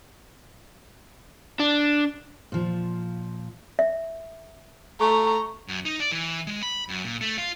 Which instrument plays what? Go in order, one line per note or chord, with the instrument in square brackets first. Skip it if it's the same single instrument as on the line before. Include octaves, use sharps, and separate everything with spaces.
[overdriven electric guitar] D4
[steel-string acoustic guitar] A#2 F3
[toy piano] E5
[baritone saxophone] A3 [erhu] A#5 [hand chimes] C#6
[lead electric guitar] F#2
D#4
D5
E3
G#3
B5
F#2
A#2
A3
F4